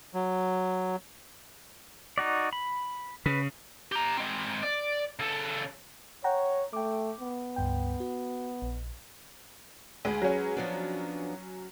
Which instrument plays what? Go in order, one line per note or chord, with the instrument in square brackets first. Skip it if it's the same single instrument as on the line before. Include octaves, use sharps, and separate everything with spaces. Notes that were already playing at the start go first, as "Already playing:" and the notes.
[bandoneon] F#3
[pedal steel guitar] D#4 F#4 D5
B5
[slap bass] C#3 [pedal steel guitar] B4
[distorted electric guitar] G4 A#5
G#3 C4
D5
C#3 A4
[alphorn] C#5 [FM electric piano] F#5 G5 A#5
[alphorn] A3 [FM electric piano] G5 D6
[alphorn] B3
[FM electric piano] C#2 G2 G5
F#4
A#1
[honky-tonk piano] D2 [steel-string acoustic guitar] G#3 G#4 B4
[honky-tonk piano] F#3 C#4
[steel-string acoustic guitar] F3 B3 D4